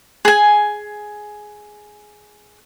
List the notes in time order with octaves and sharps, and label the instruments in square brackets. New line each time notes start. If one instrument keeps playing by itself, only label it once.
[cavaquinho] G#4 G#5